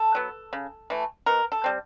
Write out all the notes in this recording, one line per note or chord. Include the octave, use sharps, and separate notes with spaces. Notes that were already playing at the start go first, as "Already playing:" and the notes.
Already playing: A4
F#3 B3
C#3
E3 A3
B2 A#4
A4
G3 C4